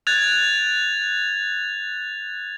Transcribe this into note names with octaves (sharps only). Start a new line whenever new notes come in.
F#6 G#6 A6 F7